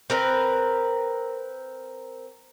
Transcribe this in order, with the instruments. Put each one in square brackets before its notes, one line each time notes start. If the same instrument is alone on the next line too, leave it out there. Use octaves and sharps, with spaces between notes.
[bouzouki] C4 A#4 B4